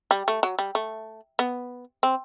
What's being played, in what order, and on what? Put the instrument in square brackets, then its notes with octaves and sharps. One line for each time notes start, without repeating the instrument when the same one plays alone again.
[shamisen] G3
A3
F#3
G3
A3
B3
C4